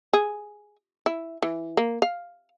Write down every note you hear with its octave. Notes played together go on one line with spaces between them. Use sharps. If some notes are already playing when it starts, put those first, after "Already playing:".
G#4
E4
E3
A#3
F5